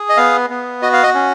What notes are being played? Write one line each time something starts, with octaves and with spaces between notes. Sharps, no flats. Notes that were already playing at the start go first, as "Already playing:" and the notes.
Already playing: G#4
D#5
B3 F5
B3
F#4 D#5
F5
D#5
C#4